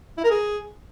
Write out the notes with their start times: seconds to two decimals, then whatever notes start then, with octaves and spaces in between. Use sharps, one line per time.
0.18 E4
0.24 A#4
0.31 G#4